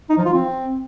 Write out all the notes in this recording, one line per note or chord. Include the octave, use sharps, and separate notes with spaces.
D#4
F3
F4
C4